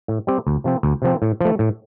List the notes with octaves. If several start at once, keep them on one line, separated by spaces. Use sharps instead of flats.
A2
G3 C4 G4
D2
C3 F3 C4
D2
C3 F3 C4
A2
F3 A3
A2